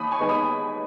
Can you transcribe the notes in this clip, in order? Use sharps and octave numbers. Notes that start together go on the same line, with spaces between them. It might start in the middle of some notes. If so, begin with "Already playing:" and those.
Already playing: D#2 B5 D#6
G#5 C#6
D#3 G#3 B3
B5 D#6